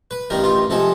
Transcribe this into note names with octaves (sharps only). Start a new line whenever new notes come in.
B4
A1 G2 D#3 G3 A#4
F4
C3 F3 G#3 A4